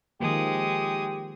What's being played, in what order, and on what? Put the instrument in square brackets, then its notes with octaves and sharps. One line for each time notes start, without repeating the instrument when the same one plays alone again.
[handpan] D#3 F3 A#3 [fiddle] G#3 D#6 [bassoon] G4